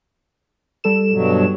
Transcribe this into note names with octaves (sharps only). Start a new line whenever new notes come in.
G3 A4 E7
G2 B2 F#3